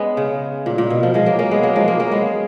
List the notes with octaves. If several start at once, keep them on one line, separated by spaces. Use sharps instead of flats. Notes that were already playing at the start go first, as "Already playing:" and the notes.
Already playing: G#3 B3 C#4
C#3
A#2
A#2
B2
F3
F3 G#3
F#3 A#3
A#3 C#4
G#3 B3
F#3 A#3
F3 G#3
F#3 A#3
A#3 C#4
G#3 B3